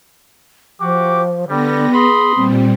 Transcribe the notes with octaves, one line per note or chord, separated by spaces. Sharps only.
F3 F#4 G4 D6
D3 G3 B3 A#6
G#4 B5 C6 D#6
A#2 G3 C4